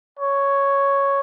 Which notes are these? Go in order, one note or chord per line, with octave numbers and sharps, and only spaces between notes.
C#5